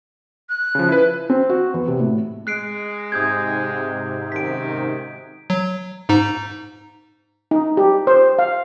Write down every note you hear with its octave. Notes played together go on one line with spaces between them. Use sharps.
F#6
C#3 F3
E4 B4
C4
F#4
E2
C3
A2
G#3 F#6 C7 D7
G#2 C3 D#6 G6 G#6
F#2 D#3 B6 D7
F#3
G#2 D#4
D#4
G4
C5
F5